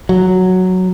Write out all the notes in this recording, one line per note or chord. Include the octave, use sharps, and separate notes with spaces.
F#3